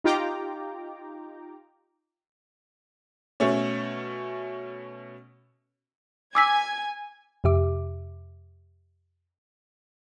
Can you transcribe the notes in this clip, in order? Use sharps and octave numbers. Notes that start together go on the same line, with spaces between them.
D#4 F4 G4 G5 A#5 D6
B2 A3 C#4
G#5 D6 E6 G#6 B6
F2 C3 G4 E5 D6